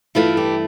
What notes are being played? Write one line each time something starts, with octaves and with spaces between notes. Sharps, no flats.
G2 E3 A3 E4 F4 A4
G4